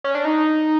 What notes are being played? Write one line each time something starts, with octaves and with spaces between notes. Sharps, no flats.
C#4
D4
D#4